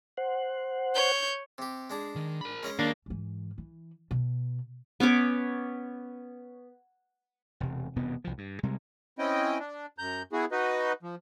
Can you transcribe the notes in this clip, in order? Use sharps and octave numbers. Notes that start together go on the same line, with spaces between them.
C5 F#5
C#5 G6
C3 G4
G#3 D4 G#4
D#3
A#4 B5
G#3 C#4 D#5
D#2 A#3 D4
G#2 E3
E3
B2
B3 C#4 C#5 D6
E1 C3
E1 G2 C3 B3
C2 F3
G2
C3 G3 G#3
C4 C#4 E4 D#5 G5
D4
F#2 A#5 G6
B3 E4 F#4 G#4
D#4 F#4 B4 D#5
F3